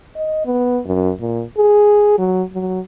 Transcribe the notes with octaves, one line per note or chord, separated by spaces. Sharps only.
D#5
B3
F#2
A#2
G#4
F#3
F#3